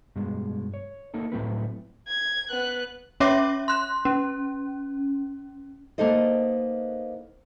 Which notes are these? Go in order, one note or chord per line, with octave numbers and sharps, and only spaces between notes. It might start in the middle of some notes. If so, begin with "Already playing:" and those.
G2 B2 G#3
C#5
A3 A#3 D#4 A4
A2 F#3 A3 C4 E4 B4
G#6
B3 F#6
C#4 C#5 E5 D6 A#6
C6 F#6
C#4
A#3 B3 D#4 A4 C5 D#5